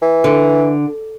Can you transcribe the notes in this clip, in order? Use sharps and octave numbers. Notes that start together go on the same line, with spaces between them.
E3
D3